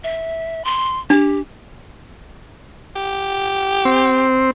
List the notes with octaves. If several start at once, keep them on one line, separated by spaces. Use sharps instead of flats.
E5
C6
D4 G4
G4
C4